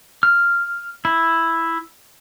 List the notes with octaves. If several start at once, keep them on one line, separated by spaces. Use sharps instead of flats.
F6
E4